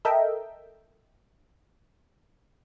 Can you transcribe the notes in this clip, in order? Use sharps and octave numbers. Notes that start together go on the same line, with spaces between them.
A4 A#4 D#5 E5 G5